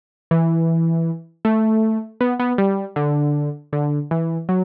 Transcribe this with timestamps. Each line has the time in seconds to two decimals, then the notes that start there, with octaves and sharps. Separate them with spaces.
0.31 E3
1.45 A3
2.21 B3
2.39 B3
2.58 G3
2.96 D3
3.73 D3
4.11 E3
4.49 F#3